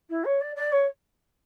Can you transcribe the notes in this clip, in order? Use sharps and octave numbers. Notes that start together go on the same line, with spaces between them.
E4
C#5
D5
D5
C#5